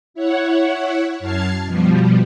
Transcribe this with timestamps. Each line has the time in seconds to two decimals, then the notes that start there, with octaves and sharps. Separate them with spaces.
0.14 E4 C#5 F#5
1.19 F#2 A5 F6 G#6 C7
1.65 B2 F3 G3